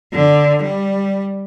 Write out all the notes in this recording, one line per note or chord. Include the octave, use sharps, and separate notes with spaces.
D3
G3